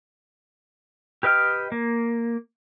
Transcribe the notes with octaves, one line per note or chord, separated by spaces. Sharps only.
G4 B4 D#5 G5 F6
A#3